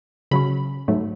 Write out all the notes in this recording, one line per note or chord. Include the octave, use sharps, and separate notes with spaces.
C#3 F#3 C#4 B5
G#2 F#3 A3